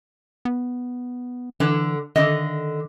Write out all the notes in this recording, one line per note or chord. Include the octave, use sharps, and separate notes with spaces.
B3
D3 E3 A5
D3 D#3 D#5